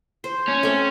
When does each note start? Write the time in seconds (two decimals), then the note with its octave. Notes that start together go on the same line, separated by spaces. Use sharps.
0.24 C5
0.49 C#4
0.63 A3 C4